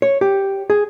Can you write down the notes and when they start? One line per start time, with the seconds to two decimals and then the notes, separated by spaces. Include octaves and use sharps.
0.02 C#5
0.21 G4
0.70 G#4